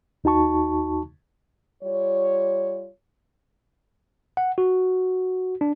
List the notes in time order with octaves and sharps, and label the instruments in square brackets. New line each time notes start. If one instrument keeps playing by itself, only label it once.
[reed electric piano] D#2 D#4 F#4 A5 C#6
[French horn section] G3 F4 C#5
[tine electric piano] F#5
F#4
D4